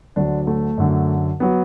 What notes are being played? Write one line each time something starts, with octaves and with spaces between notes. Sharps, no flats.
D2 D3 F#3 D4
A3
F#2 D3 F#3
F#3 B3